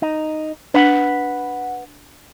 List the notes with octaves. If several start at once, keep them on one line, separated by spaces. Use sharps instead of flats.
D#4
D4 B4 F#5